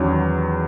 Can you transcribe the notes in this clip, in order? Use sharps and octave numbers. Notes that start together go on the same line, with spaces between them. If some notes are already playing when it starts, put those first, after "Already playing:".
Already playing: E2 D#3 F#3 C#4